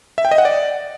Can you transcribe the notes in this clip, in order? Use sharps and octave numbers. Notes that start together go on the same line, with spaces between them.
E5
G5
D#5
F#5
D5